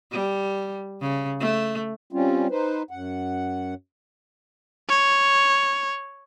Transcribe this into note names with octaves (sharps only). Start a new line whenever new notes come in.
G3
C#3
A3
G3 C4 C#4 F4
D#4 B4 C5
F#2 F#5
C#5